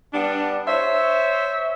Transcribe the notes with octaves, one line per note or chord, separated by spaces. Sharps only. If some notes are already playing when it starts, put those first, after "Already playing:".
G3 B3 D4
C5 C#5 E5